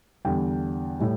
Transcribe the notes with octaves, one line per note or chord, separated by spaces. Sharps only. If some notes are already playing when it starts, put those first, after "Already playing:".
E2 D3 G3 G5
A2 G3